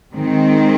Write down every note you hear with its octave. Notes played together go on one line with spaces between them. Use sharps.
D#3 G#3 C4